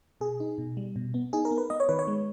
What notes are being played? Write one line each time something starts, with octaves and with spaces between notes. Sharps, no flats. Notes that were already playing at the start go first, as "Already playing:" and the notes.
B2 G#4
D#4
B2
G3
B2
B3
D#4 G#4
A#4
B3
B4
B3 D#5
C#5
D#3 B4
C#5
G#3